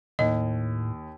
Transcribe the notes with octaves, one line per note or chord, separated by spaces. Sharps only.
D#2 A2 D#5